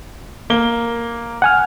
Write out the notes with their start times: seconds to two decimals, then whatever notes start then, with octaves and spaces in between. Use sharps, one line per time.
0.50 A#3 G7
1.42 F#5 G#5 F6